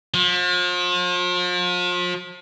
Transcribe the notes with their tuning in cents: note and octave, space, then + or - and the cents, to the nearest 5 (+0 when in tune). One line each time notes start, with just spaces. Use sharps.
F3 +40